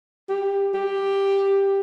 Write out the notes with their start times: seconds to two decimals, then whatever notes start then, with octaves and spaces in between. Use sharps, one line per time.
0.29 G4
0.74 G4